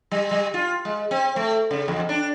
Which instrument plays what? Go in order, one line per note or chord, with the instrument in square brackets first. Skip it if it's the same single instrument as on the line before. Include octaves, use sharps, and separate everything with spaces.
[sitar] G3
G3
F4
G#3
C4
A3
C#3
E2
D4